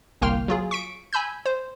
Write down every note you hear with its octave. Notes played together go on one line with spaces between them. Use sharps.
G1 C2 A#3 G5 C6 F6
F#3 F4 G#4
C#6 B6 D7
G#5 B5 E6 G6
C5